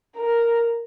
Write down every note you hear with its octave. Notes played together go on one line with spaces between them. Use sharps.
A#4